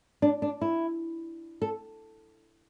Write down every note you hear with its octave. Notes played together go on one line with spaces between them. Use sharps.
D4
D4
E4
A4